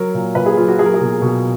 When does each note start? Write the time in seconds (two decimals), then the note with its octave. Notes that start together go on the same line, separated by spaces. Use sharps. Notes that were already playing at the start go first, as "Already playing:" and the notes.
Already playing: F#3 A#4
0.14 A#2
0.35 A#2 B4
0.46 G#4
0.57 F#3 F4
0.68 F#4
0.79 F#3 G#4
0.86 A#4
0.94 G#4
1.01 B2
1.22 B2